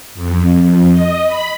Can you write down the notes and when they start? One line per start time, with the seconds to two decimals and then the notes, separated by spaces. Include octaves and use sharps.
0.15 F2
0.61 F2
0.91 D#5
1.26 B5